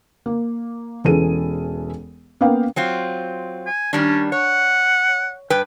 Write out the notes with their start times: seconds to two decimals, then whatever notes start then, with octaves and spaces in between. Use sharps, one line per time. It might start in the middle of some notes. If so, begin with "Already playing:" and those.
0.26 A#3
1.04 E1 E3 C#4 G#4 A4 D#7
2.41 A#3 B3 C#4 F5 G5
2.76 F#3 C4 F4
3.66 G#5
3.93 D#3 G3 C#4 D4
4.32 C#5 F#5
5.50 G2 B4 G5